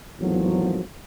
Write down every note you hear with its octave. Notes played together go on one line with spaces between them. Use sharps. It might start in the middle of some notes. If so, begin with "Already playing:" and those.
G#1 E2 A2 F3 F#3